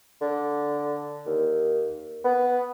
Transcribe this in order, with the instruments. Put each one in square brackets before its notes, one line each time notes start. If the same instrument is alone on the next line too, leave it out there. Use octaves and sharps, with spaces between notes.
[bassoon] D3
D#2
B3